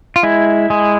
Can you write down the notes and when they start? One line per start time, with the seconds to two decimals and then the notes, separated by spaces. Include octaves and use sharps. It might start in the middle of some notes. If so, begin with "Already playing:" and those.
0.16 F4
0.23 G#3 E4
0.70 G#3